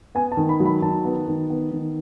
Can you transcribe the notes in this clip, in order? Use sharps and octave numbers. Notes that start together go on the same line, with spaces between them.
B3 G#5
A5
D#3
B5
F#3
B5
D#3 A5
B3
D#3
B3
D#3